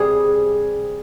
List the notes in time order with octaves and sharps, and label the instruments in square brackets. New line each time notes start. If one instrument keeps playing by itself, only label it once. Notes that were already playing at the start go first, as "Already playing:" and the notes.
Already playing: [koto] C3 G3 G#4